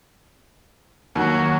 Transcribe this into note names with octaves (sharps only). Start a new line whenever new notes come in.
D#2 F#3 F#4